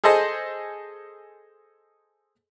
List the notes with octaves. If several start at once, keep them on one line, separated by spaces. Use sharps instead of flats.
G#4 A4 C5 D#5 G#5